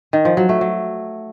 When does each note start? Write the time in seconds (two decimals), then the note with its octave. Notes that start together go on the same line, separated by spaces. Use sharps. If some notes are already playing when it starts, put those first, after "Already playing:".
0.13 D#3
0.25 F3
0.37 F#3
0.49 A3
0.61 F#3